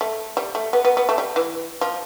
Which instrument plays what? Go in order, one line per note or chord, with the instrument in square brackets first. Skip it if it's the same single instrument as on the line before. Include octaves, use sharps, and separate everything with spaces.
[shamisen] A3
G3
A3
B3
B3
B3
A3
G3
E3
F3